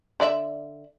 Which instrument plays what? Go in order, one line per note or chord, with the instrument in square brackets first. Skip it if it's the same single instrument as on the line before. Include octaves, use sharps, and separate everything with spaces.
[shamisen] D3 D5 E5